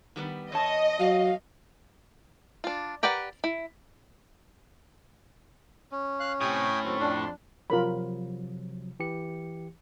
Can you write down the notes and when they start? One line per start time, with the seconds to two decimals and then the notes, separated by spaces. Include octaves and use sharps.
0.16 D#3 G3 B3
0.52 E2 C#5 D#5 A5
1.00 F#3 F5
2.64 D4 F4
3.03 G4 A#4 B4 D5 F#5
3.44 E4
5.92 C#4
6.20 F5 F#6
6.40 A2 C3 G5 G#5 D#6
6.83 D#2 F#3 C4
7.00 F2 D4 C6
7.70 C3 F3 F#3 F4 A#4 B5
9.00 E3 G4 C#7